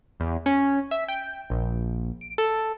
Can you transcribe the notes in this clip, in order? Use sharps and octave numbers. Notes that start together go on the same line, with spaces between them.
E2
C#4
E5
G5
A#1
D7
A4